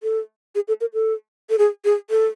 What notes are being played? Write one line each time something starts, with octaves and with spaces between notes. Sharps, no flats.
A4
G#4
A4
A#4
A4
A4
G#4
G#4
A4